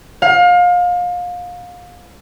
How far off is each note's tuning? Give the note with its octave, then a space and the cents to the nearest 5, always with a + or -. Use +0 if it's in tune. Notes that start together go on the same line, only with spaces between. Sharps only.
F5 +30